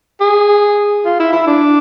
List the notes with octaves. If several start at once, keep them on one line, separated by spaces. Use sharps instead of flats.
G#4
F4
E4
E4
D4